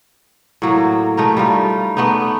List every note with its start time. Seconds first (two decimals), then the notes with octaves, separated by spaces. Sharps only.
0.62 A2 F#3 A#3
1.17 A3 D#4 A#4
1.37 G3 D#4 F4
1.97 A3 B3 D4 D#4